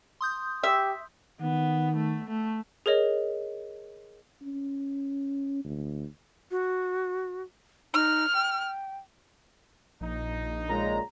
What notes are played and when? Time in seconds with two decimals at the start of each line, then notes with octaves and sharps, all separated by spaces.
0.21 C6 D#6 G6
0.63 G4 E5
1.41 D#3 B3
1.96 A3
2.28 A3
2.86 G#4 A#4 C#5 D#5
4.42 C#4
5.64 D2
6.51 F#4
7.94 D#4 F6
8.34 G5
10.01 A#1 D#4
10.69 A#2 C#3 G#3 A#5